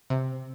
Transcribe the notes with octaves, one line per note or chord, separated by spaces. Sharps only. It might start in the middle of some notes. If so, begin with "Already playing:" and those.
C3